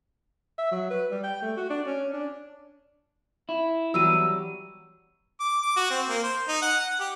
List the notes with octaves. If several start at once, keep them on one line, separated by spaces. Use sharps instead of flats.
E5
F#3
B4
G3
G5
A3
F#4
D4
C#4
D4
E4
E2 F#3 G3 E6 D#7
D6
D6
F#4
C4
A#3
C5
D#4
F#5
F#5
G4